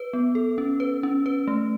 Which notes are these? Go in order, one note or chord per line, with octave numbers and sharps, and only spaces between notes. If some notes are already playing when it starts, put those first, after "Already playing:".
Already playing: B4
B3
A4
C#4
B4
C#4
B4
A3